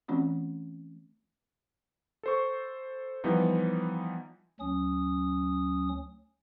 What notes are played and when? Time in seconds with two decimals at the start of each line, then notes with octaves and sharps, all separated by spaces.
0.08 E3 A3 C4 C#4 F4
2.23 A4 C5 C#6
3.24 E3 F3 G3 B3 D#4
4.60 D2 F#3 C#4 D#6